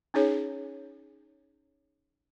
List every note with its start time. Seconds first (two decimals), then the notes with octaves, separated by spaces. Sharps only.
0.14 C#4 D#4 G#4 C#5